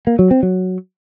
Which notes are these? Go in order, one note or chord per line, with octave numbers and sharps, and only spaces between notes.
A#3
F#3
C4
F#3